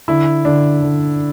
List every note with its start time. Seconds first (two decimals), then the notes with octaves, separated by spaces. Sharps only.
0.08 D3 E4
0.45 D3 D4
0.83 D3